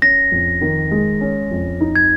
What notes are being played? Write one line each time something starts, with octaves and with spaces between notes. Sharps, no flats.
C#4 A#6
F2
D#3
G#3
C#4
F2
D#4
G#6